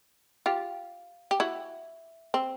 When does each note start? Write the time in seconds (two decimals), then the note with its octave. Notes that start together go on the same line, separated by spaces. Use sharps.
0.46 F4 G4
1.31 G4
1.40 E4 F#4
2.34 C4